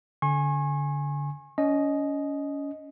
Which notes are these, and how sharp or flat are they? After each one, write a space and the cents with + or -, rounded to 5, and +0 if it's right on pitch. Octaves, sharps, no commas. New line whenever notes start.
D3 -25 G#5 +0 C#6 -40
C#4 +30 D#5 +0